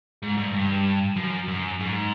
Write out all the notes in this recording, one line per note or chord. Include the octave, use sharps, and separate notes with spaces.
G#2
G2
G2
F#2
F#2
G#2